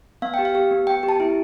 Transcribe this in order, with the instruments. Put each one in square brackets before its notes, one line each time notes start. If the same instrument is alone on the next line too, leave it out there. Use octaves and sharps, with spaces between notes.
[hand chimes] B3 F5
G4 G5
F5
G4
B3
B3 G5
G4
A5
E4